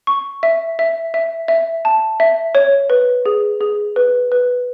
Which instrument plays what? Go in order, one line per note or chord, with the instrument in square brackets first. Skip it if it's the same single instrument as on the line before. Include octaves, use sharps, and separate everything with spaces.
[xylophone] C#6
E5
E5
E5
E5
A5
E5
C#5
B4
G#4
G#4
B4
B4